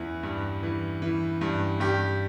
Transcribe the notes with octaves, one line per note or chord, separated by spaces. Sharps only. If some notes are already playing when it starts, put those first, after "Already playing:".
Already playing: E2 E3 E4
G2
E3
E3
G2
G2 G4